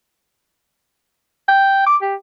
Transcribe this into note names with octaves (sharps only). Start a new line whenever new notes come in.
G5
D6
G4